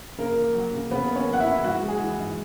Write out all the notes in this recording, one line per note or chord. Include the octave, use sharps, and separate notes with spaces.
C#3 A#3 A#4
A#3
F#3
C#3
C#3 B3 B4
A#3
C#4 C#5
F#3
F#5
E4 E5
C#3
G#2 F#4 F#5
G#3
G#4
E3
G#2